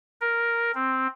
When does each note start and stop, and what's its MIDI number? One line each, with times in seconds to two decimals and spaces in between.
0.21 0.72 70
0.75 1.07 60